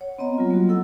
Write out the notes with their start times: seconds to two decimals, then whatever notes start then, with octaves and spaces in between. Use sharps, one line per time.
0.01 C#5 F#5
0.18 B3 C4 D#5 A#5
0.38 F#3 G3 F4
0.50 A#3 F#4
0.69 E4 A4 F#5 E6